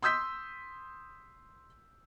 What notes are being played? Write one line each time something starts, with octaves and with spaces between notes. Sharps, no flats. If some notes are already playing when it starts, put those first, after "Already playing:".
C6 D#6 E6 G6 B6